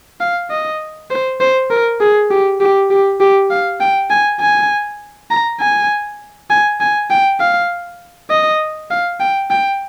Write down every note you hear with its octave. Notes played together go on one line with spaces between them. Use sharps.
F5
D#5
C5
C5
A#4
G#4
G4
G4
G4
G4
F5
G5
G#5
G#5
A#5
G#5
G#5
G#5
G5
F5
D#5
F5
G5
G5